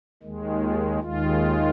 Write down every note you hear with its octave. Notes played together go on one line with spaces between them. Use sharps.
D#2 D#3 G#3
F4
D#2 D#3 G#3 F4